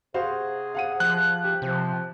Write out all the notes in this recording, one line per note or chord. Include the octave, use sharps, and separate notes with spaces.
C3 F#4 G#4 C5 F5
F5 F#5 D#7
F3 F#6
G4
C3 F3